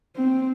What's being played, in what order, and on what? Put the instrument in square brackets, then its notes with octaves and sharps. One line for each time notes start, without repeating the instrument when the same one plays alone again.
[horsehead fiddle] C4